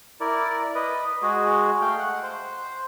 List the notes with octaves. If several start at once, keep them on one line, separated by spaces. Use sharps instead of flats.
E4 A#4 D5
B4 D#5
G#3 F#4 G#4
A3 F5 G5
F#5
C5